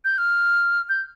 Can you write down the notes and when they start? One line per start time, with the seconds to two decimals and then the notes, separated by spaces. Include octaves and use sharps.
0.05 G6
0.18 F6
0.89 G6